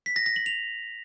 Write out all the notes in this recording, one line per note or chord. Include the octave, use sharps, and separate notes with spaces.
B6
A#6
A#6
F#7
F7